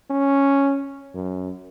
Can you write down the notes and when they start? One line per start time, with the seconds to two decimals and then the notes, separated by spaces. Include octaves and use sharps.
0.10 C#4
1.15 F#2